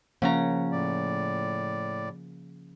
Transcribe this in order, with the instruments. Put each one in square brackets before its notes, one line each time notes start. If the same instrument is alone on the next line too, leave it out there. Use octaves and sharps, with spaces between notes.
[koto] C#3 C#4 A#5 [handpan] F3 A#3 F#5
[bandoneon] A2 D5